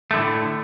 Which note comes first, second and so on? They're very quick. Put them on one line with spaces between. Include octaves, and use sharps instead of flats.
A3 D3 A2